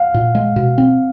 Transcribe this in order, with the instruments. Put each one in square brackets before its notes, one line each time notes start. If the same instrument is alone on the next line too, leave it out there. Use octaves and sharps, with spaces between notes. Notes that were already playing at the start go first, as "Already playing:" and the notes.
Already playing: [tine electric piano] F5 F#5
[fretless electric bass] A#2
G#3
B2
C4